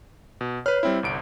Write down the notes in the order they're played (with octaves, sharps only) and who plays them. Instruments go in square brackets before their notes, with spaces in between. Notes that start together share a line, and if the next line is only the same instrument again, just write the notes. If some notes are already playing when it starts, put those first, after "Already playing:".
[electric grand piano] B2
[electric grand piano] B4 F6 [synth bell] C#5
[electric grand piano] G3 C4 E4
G1 C2 D7